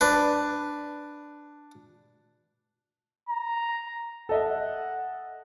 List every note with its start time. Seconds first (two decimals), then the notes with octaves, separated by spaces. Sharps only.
0.01 D4 B4
3.29 A#5
4.29 A4 D#5 E5 F#5